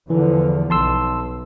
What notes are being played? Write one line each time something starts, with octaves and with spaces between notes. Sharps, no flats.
E2 D3 E3 F3
B1 A5 C6 E6